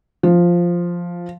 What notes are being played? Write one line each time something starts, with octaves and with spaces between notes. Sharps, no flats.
F3